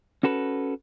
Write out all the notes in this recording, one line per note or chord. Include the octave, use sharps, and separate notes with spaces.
C#4 F#4 A4 B4